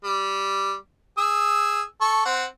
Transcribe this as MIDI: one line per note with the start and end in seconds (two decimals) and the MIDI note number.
0.04 0.74 55
1.18 1.82 68
1.18 1.82 88
2.01 2.25 69
2.01 2.25 85
2.25 2.45 60
2.25 2.45 78